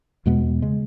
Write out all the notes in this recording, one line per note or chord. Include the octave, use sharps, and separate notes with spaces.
E2 B2 G#3 B3
C#3 G#3